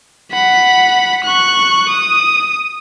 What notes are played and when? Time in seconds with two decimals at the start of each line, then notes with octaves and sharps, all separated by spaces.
0.32 F#5 B5
1.24 C#6 F#6
1.89 D#6